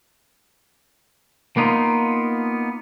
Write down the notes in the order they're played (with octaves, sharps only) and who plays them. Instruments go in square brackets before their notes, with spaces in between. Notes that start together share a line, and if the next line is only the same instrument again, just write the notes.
[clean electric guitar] A#3 B3 D#4 F4